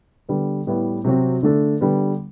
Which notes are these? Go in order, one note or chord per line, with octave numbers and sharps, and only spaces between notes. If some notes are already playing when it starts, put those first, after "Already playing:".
D3 G3 B3
A2 G3 B3 E4
C3 F#3 C4 F#4
D3 A3 D4 A4
D3 G3 B3